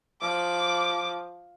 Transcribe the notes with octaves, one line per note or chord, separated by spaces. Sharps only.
F3 D6